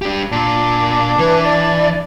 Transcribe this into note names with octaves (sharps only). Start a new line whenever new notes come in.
D4 G4
A#2 D4
E3 B4
D5